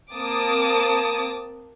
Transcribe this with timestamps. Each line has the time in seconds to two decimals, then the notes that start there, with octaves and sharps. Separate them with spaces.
0.14 A#3 C4 A5 D6 D#6